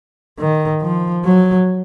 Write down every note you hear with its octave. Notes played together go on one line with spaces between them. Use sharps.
D#3
F3
F#3